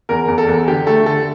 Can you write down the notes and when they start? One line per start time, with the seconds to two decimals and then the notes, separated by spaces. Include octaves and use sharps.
0.09 E2 A#4
0.28 E2
0.38 A4
0.48 E2
0.67 D3 G4
0.87 A3 A4
1.06 D3 A4